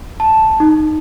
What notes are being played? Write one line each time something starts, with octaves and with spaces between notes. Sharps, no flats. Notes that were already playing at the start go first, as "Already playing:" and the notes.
A5
D#4